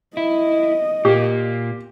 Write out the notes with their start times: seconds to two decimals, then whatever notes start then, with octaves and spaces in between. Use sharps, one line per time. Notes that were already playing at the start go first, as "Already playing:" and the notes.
0.17 E4 D#5
1.05 A#2 A#3 G4